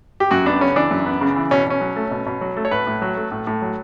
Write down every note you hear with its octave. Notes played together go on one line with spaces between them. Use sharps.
G4
F#2 F#4
B3 D4
C#3 C#4
E3 D4
F#2
B3
C#3
E3
B2 C#4
B2 C#4
F#3
A3
B2
B2
F#3
A3
C#5
A2 B4
A2
F#3
A3
A2
A2
F#3